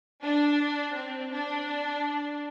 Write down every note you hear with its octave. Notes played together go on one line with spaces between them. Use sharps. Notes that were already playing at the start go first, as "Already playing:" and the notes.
D4
C4
D4